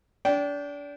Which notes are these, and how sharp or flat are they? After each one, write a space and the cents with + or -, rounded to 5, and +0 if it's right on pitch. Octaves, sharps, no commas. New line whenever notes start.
D4 -30 G5 -10